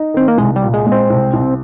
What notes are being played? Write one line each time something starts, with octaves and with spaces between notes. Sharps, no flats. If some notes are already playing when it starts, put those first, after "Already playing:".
Already playing: D#4
D#3 C4
A#3
C2 G#3
G3
A#2
G#3
G#3
C4
C2
C2